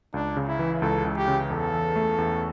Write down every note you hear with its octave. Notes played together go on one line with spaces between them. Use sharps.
C#2 D4
C#3
E4
E3
C#2 A4
C#2
G4
C#3
E2 A4
E3
A3
E2